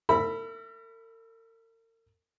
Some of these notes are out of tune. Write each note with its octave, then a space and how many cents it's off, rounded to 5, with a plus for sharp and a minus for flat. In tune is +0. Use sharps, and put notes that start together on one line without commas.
A#4 -45 E5 +5 B5 +0